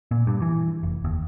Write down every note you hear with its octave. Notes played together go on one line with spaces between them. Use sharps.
A#2
G2
E3
F1
D#2